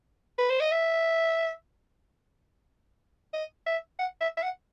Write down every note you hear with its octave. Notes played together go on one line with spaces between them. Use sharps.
B4
C5
D#5
E5
D#5
E5
F#5
E5
E5
F#5